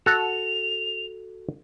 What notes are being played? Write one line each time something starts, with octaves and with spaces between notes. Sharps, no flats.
F#4 A4 F7